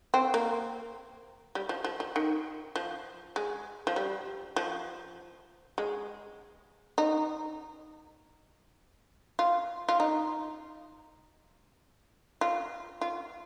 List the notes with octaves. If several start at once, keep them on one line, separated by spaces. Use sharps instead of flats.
C4
A#3
G3
F3
F3
F3
D#3
F3
G#3
F3
G3
F3
G#3
D#4
F4
F4
D#4
F4
F4